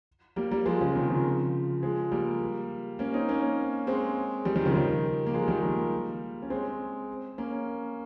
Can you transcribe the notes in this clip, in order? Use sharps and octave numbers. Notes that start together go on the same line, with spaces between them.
G3 A#3
G3 A#3
F3 G#3
C#3 F3
C3 D#3
C#3 F3
F3 G#3
G3 A#3
A#3 C#4
C4 D#4
A#3 C#4
G#3 C4
D#3 G3
D#3 G3
C#3 F3
D#3 G3
A#3
F3 G#3
D#3 G3
G3 A#3
C#4
G#3 C4
A#3 C#4